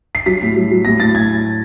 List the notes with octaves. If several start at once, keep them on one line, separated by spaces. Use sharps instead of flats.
C7
F#3 B6
A2
F#3
F#3
A2 A#6
A2 A6
A2 G#6